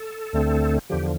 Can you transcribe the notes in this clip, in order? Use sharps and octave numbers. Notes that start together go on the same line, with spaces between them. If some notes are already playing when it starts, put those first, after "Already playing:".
Already playing: A4
D2 D3 A3 C4
E2 D3 F3 G4